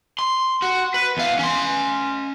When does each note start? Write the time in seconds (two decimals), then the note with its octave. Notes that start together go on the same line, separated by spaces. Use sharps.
0.19 C6
0.62 F#4
0.94 B4
1.17 E2 F5
1.39 C#4 C6